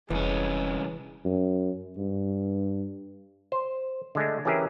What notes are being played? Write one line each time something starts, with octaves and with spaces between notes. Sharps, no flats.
F1 C2 E3 G#3 C#4
F#2
G2
C5
D3 G#3 A3
E3 C#4 G4 G#4 A#4 E5